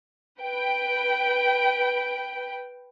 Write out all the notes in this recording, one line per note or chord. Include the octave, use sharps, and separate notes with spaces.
B4 G5